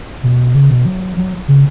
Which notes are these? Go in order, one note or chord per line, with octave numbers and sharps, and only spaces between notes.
B2
C#3
B2
F#3
F#3
C#3